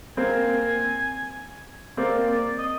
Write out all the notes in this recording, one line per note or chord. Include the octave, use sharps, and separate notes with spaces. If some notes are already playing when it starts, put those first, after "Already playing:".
A#3 C4 G#5
A#3 C4 D5
D5
D#5